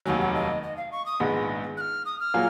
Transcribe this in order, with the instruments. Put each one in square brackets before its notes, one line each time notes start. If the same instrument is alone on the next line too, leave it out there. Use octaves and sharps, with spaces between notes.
[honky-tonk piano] F1 D#2 D#3 F#3 [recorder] G#5
[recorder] F#5
D#5
D#5
F5
C#6
D#6
[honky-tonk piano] A#1 G#2 D#3 G#3 B3
[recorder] F#6
F6
D#6
F6
[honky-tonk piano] A#2 F#3 A#3 F4 G#4